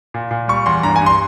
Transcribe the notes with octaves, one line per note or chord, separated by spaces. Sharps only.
A#2
A#2
G3 C#6
E2 C6
G2 A#5
G#5
G2
C6